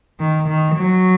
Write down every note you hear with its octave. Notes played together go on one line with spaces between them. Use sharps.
D#3
D#3
F#3